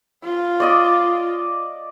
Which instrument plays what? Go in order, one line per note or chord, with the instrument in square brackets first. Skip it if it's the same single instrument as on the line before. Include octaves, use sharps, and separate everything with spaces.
[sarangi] F4
[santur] D5 D#5 D6